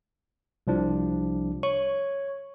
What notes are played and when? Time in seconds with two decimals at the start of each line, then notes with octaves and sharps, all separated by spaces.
0.67 C2 F3 D4
1.63 C#5 C#6